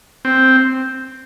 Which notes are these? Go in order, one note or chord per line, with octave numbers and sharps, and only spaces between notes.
C4